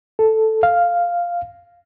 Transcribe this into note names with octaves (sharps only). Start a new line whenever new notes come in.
A4
F5